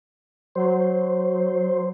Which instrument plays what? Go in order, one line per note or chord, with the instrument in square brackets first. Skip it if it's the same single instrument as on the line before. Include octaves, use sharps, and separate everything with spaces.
[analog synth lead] F#3 [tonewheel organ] C5